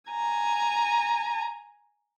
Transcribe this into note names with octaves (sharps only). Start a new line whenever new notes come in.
G#5 A#5